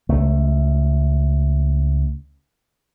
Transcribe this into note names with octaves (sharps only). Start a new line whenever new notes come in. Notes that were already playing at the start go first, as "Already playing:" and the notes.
C#2 A3